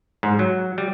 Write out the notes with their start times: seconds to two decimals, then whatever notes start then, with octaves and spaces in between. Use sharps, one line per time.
0.23 G#2
0.39 F#3
0.78 G3